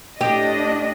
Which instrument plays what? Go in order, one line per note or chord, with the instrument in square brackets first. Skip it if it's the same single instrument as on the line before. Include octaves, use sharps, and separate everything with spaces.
[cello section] A2 D4 D#5 [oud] G4